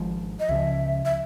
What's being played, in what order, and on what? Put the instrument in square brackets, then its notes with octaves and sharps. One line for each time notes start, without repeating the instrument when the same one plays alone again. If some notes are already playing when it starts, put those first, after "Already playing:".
Already playing: [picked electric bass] G#1 G#2 F3
[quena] D#5
[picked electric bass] C#2 C#3 F3 [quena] E5
[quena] E5